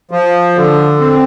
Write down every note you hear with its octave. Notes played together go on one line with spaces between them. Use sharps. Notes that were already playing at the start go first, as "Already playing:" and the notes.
F3
D3
C4